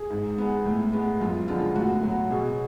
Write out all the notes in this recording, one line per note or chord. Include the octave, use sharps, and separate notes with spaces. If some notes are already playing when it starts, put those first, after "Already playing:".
Already playing: G#4
G#2
G#3 B3
A2
G#3 B3
F#2 F4
D3 F3 G#3 B3 F4
A2 F#4
F#3 B3
B2 G#4